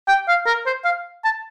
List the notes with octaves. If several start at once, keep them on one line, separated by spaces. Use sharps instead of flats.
G5
F5
A#4
C5
F5
A5